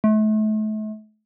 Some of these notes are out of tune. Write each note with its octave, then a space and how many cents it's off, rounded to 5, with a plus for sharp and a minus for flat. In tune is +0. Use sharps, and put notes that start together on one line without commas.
A3 -35